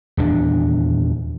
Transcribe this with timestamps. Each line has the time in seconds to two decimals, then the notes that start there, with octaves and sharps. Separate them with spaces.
0.17 D#1 E2 D4